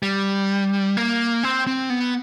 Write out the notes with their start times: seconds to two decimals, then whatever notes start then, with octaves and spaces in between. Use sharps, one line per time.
0.03 G3
0.97 A#3
1.43 C4
1.67 C4
1.90 B3